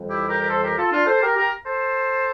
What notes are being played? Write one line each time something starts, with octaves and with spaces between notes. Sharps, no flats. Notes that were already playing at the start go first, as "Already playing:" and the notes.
Already playing: F2 E3 G3
E4 G4
G4 A#4
A#4
A4 C5
G4 A#4
F4 A4
D4 F4
A4 C5
G4 A#4
G4 A#4
A4 C5